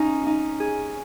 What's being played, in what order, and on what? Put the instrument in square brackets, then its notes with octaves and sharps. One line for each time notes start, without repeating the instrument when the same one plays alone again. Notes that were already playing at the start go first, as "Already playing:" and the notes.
Already playing: [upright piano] C#4 [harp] D#4
[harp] D#4
G#4